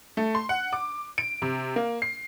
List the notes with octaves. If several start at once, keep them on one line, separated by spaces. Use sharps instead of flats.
A3
C6
F#5
D6
D7
C3
A#3
C7